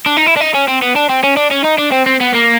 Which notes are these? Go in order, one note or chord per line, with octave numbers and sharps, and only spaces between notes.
D4
D#4
E4
D4
D#4
C#4
C4
B3
D4
C4
C#4
D4
C#4
D#4
D4
C4
C4
B3
A#3